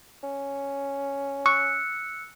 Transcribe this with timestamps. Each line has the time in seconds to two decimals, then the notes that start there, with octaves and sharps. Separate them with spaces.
0.24 C#4
1.46 C#6 E6 F#6 C#7